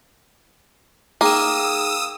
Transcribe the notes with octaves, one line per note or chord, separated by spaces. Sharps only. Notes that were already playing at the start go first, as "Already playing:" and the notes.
A#3 D#4 G#4 G5 D#6 E6